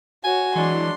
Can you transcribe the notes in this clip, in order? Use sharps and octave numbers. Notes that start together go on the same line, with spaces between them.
F#4 C#5 G#5
E3 F#3 G#3 D4 C6